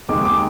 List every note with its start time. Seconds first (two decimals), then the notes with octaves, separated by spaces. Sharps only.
0.09 D#2 D#3 G#3 D6
0.25 D6